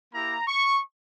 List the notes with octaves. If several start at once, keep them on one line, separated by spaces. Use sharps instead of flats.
A#3 E4 G4 A#5
C#6